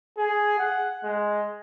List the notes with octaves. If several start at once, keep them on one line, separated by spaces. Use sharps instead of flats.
G#4
F#5
G#3